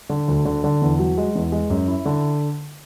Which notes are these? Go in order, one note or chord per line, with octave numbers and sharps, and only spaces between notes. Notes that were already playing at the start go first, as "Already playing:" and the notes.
D3
D2
D3
D3
E2
F#3
G#3
E2
G#3
F#2
E4
D3